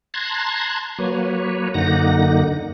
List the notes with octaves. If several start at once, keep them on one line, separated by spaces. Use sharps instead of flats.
A5 A#5 C6 F#6 G#6
F#3 A#3 B4 C#5
F#2 D3 A#3 D#4 F#5 A#6